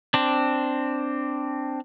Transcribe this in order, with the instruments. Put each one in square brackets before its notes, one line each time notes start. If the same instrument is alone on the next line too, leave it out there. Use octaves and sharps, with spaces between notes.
[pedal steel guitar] C4 D4